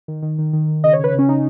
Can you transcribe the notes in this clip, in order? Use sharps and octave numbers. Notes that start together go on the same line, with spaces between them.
D#3
D#3
D#3
D#3
D#3
C#3 D#5
C#5
C#3 B4
C#3 C#4
C#3 D#4